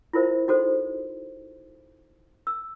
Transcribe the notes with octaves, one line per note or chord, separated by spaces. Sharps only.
E4 F4 A#4 C5 E5
D#4 F#4 A4 C5
E6